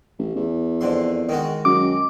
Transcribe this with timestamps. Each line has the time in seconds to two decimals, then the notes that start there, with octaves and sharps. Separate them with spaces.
0.19 A1
0.35 E2
0.81 F2 D3 C6
1.29 D#3 G#3 F#4
1.65 F#2 D6